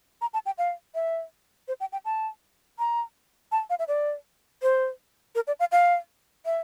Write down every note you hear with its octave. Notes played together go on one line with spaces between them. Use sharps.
A#5
A5
G5
F5
E5
C5
G5
G5
A5
A#5
A5
F5
E5
D5
C5
A#4
D5
F5
F5
E5